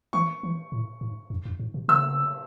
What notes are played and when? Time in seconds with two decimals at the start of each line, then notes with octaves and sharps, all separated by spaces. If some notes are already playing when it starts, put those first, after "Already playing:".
0.13 E3 C#6
0.43 E3
0.72 A2
1.01 G#2
1.30 F#2
1.45 F#2
1.59 G#2
1.74 B2
1.88 C#3 E6